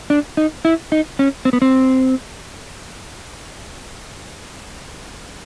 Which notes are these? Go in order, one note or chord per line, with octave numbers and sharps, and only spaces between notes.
D4
D#4
E4
D#4
C#4
C4
B3
C4